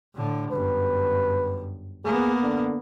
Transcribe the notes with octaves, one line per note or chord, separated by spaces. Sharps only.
A2 D3
G1 F#2 B4
A#3 B3 G#4
D3